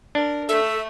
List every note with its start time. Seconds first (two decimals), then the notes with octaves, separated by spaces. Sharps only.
0.15 D4 A#4
0.49 A3 A4 E5